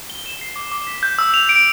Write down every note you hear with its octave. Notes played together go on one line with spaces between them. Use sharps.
G7
E7
C7
D6
D6
B6
G6
E6
F7
D7